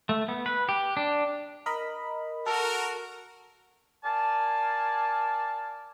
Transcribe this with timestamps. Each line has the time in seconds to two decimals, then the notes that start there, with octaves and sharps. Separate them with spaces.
0.09 A3
0.28 B3
0.46 B4
0.69 G4
0.97 D4
1.66 A#4 D#5 B5
2.46 F#4 A4 A#4
4.04 A#4 D5 F5 G#5 A5